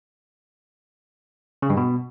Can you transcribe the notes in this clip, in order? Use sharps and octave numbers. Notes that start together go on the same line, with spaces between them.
C#3
G2
B2